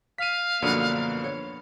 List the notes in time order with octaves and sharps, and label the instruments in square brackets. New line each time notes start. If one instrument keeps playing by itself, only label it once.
[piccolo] F5 [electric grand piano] B6 D#7
[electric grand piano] F#2 B2 F3 [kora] D3 B3 [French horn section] A#3
[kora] C#5